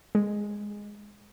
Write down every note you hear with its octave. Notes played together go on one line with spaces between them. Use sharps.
G#3